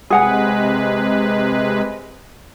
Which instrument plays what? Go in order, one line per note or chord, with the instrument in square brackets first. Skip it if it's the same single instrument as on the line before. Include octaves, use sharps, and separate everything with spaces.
[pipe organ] C3 G#3 B4 [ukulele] G#4 F#5 G#5